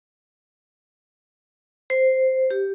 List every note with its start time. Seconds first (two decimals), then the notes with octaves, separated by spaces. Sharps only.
1.90 C5
2.51 G4